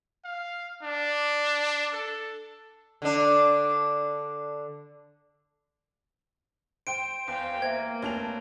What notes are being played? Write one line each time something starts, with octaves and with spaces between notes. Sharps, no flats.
F5
D4
A4
D3 D4
C5 G5 D7
E2 C5 F5 G5
A#3 C5 E5 G#6
F1 D4 F#4 C#5 A5 F7